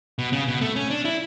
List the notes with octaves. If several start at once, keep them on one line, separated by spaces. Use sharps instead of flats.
B2
C#3
B2
A3
C#4
D4
E4